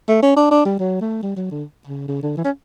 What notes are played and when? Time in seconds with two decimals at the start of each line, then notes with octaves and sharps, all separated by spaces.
0.08 A3
0.22 C#4
0.36 D4
0.51 D4
0.65 G3
0.79 F#3
1.01 A3
1.22 G3
1.36 F#3
1.51 D3
1.87 C#3
2.08 C#3
2.22 D3
2.37 E3
2.44 C#4